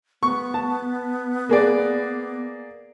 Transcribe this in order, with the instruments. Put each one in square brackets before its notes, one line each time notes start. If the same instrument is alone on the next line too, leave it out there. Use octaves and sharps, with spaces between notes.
[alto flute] B3 [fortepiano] C#6
[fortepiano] A5
A#3 G#4 D5